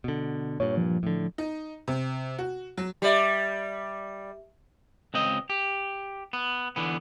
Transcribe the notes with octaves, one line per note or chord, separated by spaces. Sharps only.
B2 D3
G2 A#2 C#5
F3
A2 D3
D#4
C3
F#4
F#3
G3 G4 D5 E5
C#2 C4 D#5
G4
B3
D3 E3 B3